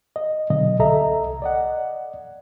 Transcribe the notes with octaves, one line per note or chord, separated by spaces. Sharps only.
D#5
B2 D3 F#3 D#5
C2 A4 D#5 E5 A#5
D5 D#5 F#5